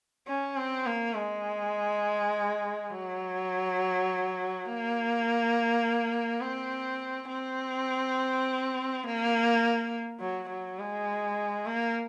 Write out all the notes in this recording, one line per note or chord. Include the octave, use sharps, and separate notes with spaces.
C#4
C4
A#3
G#3
F#3
A#3
C4
C4
A#3
F#3
F#3
G#3
A#3